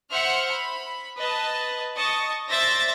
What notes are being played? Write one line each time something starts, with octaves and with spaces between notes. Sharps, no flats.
C5 E5 F#5 F6 C#7
B5
B4 D#5 A5
D#5 A5 C#6
C5 D5 E5 A6 A#6